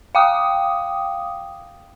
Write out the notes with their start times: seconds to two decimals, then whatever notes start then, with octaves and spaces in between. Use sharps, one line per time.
0.15 F5 G5 D6 D#6